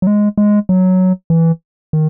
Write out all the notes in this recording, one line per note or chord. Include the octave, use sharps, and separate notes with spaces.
F#3
G#3
G#3
F#3
E3
D#3